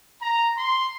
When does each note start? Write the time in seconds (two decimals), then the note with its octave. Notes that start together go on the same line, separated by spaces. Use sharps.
0.21 A#5
0.57 C6